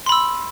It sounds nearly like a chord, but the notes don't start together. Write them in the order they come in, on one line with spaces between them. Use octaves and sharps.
C6 B5 E6